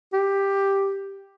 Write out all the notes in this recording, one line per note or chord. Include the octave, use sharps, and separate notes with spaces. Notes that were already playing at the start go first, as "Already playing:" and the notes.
G4